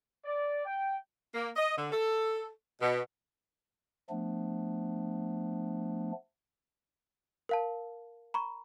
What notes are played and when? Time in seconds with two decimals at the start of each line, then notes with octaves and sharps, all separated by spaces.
0.25 D5
0.65 G5
1.35 A#3
1.56 D#5
1.77 D3
1.92 A4
2.81 B2
4.10 F3 A3 B3 D4
7.49 A#4 F5 A5
8.34 A#5 B5 C#6